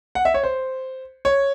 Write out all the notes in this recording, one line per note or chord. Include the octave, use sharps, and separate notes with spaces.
F#5
E5
C#5
C5
C#5